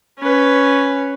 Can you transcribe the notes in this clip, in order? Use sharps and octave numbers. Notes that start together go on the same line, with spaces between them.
C#4 B4